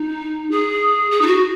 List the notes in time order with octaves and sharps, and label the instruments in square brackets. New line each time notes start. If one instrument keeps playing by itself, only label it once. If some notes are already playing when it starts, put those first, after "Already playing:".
Already playing: [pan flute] D#4
G#4
G#4
D#4
F#4